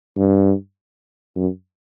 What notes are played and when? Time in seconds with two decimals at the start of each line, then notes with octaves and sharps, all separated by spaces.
0.17 G2
1.36 F#2